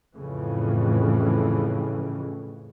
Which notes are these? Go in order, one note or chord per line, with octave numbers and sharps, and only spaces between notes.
F2 A2 C#3 E3